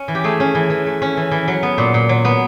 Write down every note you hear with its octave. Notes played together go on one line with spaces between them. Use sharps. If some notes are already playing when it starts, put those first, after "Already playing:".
Already playing: C#4
E3
G4
A3 G#4
C#4
E3
E3
A3
C#4
E3
E3
F#3
B3
A#2
A#2
F#3
B3